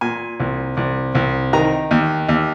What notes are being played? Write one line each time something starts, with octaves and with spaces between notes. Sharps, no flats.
A#2 G#5
C2
C2
C2
D#3 A#5
D#2
D#2